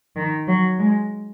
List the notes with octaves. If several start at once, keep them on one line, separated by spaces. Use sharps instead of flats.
D#3
F#3
G#3